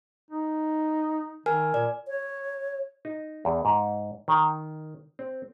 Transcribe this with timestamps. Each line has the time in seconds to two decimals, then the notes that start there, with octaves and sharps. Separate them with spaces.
0.31 D#4
1.46 D#3 A#4 G#5 F6
1.74 A#2 D5
2.08 C#5
3.05 D#4
3.45 E2
3.65 G#2
4.28 D#3
5.19 C4